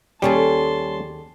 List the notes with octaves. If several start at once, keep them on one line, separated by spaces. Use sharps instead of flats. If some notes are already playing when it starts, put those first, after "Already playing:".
D#2 G3 C#4 G#4 A4 A5 C6